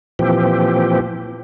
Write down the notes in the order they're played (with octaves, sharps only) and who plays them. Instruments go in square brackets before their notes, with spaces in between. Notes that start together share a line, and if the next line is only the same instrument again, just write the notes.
[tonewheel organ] A#2 E3 F3 C4 G4